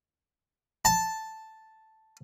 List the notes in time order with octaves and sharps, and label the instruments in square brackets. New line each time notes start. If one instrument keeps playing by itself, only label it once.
[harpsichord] A5